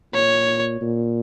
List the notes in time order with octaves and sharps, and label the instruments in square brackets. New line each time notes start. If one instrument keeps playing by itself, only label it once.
[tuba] A#2 [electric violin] C#5
[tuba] A#2